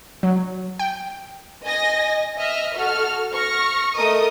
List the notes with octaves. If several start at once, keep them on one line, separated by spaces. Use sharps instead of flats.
F#3
G5
D#5 G#5 A#6
D#5 E5 F6
F#4 A4 F6
C#6 F6 A#6
A3 A#4 D#5 D#6